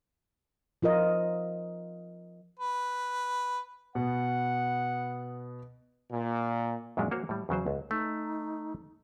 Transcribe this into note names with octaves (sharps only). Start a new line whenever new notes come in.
F3 F4 A#4 D#5
B4
B2 B3 F#5
A#2
F#2 A#2 F#3 G#3 C#4 D4
A#3 F#4 A#4 C5 C#5
A2 G3
E2 C#3 F#3 C5
C#2
A3 D#4